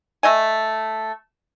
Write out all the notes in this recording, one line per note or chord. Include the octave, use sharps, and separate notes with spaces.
A3 D#5 G#5